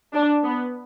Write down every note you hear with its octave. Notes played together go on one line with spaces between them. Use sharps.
D4
B3